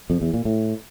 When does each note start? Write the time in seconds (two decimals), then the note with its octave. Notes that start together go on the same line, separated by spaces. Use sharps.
0.10 F2
0.22 E2
0.33 A#2
0.45 A2